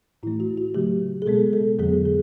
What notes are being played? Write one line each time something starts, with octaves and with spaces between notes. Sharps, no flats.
A2 E3 A3 E4
F#4
F#4
C#3 F#3 A3 G4
G#4
B2 G#3 B3 A4
A4
F2 D3 F#3 B3 G#4
G#4